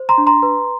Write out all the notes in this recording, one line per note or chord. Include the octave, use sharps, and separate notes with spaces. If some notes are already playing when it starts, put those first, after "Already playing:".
Already playing: C5
A#5 C6
D4
A#5 C6
B4